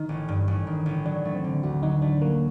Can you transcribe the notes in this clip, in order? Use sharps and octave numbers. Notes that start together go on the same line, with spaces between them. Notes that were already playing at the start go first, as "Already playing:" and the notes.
Already playing: D#3 D#4
A1
G2
A1
D#3
A1
F#3 D4
A3
C4
D3
D2 F#4
F#3 D#4
A3 D4
F#3 A#3